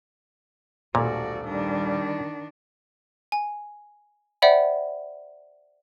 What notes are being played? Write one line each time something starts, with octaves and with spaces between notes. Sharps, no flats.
D#1 B1 A#2 A3 F#4 D5
D#3 G3 D4
G#5
C5 D5 E5 F#5 G5 B5